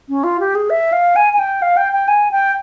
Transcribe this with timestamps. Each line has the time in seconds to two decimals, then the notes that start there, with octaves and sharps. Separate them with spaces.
0.09 C#4
0.24 F4
0.40 G4
0.55 G#4
0.70 E5
0.92 F5
1.16 G#5
1.33 G#5
1.39 G5
1.62 F5
1.77 G5
1.93 G5
2.08 G#5
2.31 G5